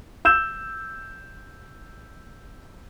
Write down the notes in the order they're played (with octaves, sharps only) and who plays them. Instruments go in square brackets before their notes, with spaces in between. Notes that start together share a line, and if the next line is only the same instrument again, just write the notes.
[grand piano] E6 G6 E7